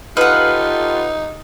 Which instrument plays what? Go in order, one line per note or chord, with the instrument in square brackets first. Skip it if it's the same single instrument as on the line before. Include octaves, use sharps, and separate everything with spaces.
[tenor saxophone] D#4 [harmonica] F4 G4 A4 [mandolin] B4 F#5 [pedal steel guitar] F5